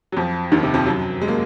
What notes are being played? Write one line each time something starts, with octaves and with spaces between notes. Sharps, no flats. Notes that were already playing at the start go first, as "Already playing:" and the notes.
F#3
F2 F3
D#2 D#3
C3
F2 F3
F#2 F#3
G#3
A#3